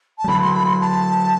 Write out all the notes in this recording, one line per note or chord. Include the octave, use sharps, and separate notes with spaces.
A5
G3
D3 F#3 B5
C6
B5
C6
A5